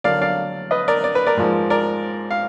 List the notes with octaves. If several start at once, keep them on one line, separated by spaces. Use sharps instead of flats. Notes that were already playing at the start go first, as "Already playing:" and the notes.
D3 F#3 A#3 D5 F5
D5 F5
B4 D#5
A#4 D5
D5
B4
A#4 D5
G#2 F3 A#3
A#4 D5
F5